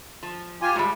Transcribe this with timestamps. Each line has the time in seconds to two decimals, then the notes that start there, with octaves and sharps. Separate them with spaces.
0.23 F3
0.62 F4 G4 G#5
0.76 A2 G3 G#3